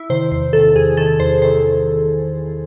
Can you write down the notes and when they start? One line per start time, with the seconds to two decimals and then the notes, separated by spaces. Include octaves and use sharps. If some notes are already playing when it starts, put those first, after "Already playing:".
Already playing: E4
0.10 C3 D#3 C5
0.31 E2 C5
0.53 C3 D#3 A4
0.75 E2 G#4
0.97 C3 D#3 A4
1.20 E2 C5
1.42 C3 D#3 C5